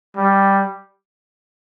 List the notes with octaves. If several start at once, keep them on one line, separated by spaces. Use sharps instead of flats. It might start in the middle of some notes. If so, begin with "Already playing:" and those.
G3